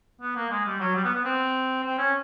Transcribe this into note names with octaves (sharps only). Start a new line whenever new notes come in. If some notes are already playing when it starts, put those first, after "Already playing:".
B3
A#3
G#3
G3
F#3
G3
B3
B3
C4
C4
C#4